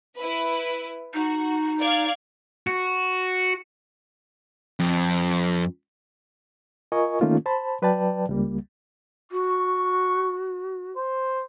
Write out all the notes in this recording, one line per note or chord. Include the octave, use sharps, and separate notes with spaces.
E4 B4
D#4 F#4
D5 F5 G#6
F#4
F2
F4 A#4 D#5 G#5 C#6
D#3 A3 A#3 C#4 D#4 F4
C5 A5 B5
F#3 B4 D5 G5 A5
C#2 G3 A#3
F#4 C#6
C5